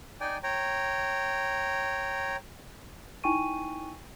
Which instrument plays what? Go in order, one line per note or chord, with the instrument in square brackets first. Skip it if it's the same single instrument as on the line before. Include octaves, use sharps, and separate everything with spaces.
[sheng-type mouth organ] D#4 D5 G5 G#5
C#5 G5 A#5
[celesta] D#4 E4 G5 G#5 C#6 D#7